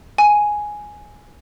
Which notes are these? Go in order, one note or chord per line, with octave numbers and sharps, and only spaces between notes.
G#5